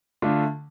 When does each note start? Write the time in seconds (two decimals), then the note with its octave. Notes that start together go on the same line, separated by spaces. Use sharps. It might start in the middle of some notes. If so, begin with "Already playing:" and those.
0.22 D3 A3 D4 F4